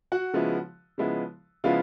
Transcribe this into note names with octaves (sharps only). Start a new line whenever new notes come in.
F#4 F#5
C#3 F3 G#3 B3 E4
C#3 F3 G#3 B3 E4
C#3 F3 G#3 B3 E4 F4 F5